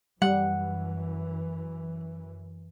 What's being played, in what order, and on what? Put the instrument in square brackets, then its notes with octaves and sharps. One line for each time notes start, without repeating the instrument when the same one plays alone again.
[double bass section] F#2 E3 [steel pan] G3 [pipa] F#5